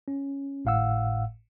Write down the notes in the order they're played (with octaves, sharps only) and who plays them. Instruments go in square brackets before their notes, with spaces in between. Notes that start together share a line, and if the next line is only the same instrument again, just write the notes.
[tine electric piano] C#4
G#1 A2 F5 F#5 E6